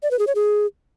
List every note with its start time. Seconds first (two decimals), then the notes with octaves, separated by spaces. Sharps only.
0.03 D5
0.11 B4
0.19 G#4
0.27 C#5
0.35 G#4